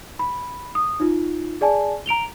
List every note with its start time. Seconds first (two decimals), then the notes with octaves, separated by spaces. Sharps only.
0.19 B5
0.75 D#6
1.00 D#4 F4
1.61 G#4 D5 G#5 A5
2.06 A#5 D7 F7 G7